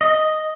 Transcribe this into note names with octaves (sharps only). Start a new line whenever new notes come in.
D#5